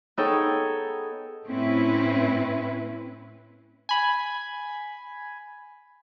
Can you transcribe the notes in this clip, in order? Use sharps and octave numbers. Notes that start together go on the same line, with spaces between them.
B3 D#4 G#4 A4 C#5 G5
A2 C4 C#4 E4 B4
G#5 B5